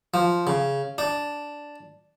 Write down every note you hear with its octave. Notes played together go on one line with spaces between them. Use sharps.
F3
C#3
D4